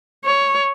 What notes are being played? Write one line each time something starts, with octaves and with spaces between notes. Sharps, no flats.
C#5